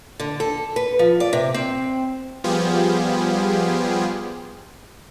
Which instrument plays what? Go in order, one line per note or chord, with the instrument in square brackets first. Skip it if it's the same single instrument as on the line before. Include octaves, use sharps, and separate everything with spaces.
[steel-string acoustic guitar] D3
A4
B4
F3
D5
C3
C4
[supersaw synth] F3 G3 B3 F4 G4 G#4